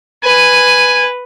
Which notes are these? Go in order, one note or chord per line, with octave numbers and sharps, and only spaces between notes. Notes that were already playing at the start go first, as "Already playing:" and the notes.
B4 G#5